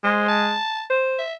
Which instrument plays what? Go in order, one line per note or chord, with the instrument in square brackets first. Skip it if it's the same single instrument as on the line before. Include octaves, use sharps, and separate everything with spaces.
[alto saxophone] G#3 [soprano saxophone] C5
[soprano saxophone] A5
[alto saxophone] C5
[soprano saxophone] E5